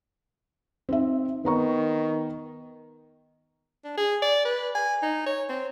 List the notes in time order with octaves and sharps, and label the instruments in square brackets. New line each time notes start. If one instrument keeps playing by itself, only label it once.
[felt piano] C4 D#4 E5
[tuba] D#3 [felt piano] B3 A#5 C#6
[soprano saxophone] D4
G#4
D5
B4
G#5
D#4
C#5
C4